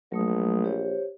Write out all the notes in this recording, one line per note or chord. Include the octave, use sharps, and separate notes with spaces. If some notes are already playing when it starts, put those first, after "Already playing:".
A#1 F#3 A3 D#6
G4 C5 C#5